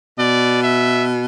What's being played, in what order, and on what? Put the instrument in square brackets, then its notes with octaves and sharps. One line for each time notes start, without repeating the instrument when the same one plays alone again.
[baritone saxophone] B2 [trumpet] D5
[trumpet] E5